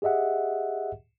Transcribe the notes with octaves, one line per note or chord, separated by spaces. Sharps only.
G4 G#4 D#5 E5 F#5